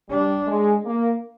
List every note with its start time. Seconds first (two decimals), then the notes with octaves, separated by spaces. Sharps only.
0.09 G3 D4
0.47 G#3
0.85 A#3